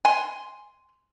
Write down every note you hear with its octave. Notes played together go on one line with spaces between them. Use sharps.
G#5 C6